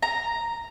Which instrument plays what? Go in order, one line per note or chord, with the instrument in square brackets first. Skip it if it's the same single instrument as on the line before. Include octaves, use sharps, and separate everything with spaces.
[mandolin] A#5